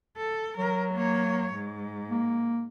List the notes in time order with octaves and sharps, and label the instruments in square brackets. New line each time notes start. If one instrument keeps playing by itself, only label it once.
[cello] A4
[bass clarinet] F#3 [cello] A#4
[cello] A#3 C#5
G#2
[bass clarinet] A#3